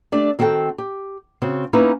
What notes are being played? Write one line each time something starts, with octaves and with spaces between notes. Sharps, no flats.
A3 D4 G4 D5
D#3 C4 F#4 A4 G5
G4
C#3 C4 F#4
A#3 B3 C#4 D#4 E4 B4